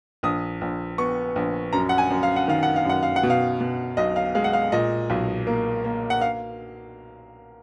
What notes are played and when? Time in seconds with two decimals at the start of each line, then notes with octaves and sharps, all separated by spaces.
0.23 A#1 D#6
0.61 A#1
0.98 B3 C#6
1.36 A#1
1.73 F#2 A#5
1.89 F#5
1.98 G#5
2.10 F#2
2.23 F5
2.36 F#5
2.48 D#3 F5
2.63 F#5
2.76 F5
2.85 F#2 F#5
3.03 F5
3.16 F#5
3.23 B2
3.30 F5
3.60 B2
3.97 B1 D#5
4.16 F5
4.35 G#3 F5
4.44 F#5
4.53 F5
4.72 A#2 D#5
5.10 B1
5.47 A#3
5.84 A#3
6.10 F#5
6.21 F5